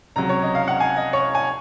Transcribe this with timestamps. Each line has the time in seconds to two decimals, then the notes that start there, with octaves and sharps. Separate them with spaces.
0.16 C#2 C3 F#3 A#5
0.29 C#5
0.43 D#5
0.55 F5
0.68 F#5
0.80 G#5
0.96 D#5
1.13 C#5
1.35 G#5